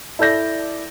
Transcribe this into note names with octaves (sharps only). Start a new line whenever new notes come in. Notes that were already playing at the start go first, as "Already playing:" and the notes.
E4 A4 D5 G6 A#6